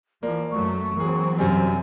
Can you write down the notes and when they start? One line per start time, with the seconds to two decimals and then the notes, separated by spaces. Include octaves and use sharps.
0.23 E3 F3 A#3 D5
0.51 F#2 F#3 A3 C#6
0.97 E3 F#3 A#3 C4 G#4
1.38 F#2 C3 G3 G#5